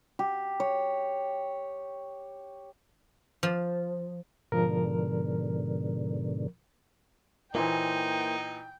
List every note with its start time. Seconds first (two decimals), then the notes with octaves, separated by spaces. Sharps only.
0.19 G4
0.60 C#5
3.43 F3
4.52 G#2 B2 D3 F3 A#4
7.55 A#2 E3 A#3 D#4 E4 C5 G5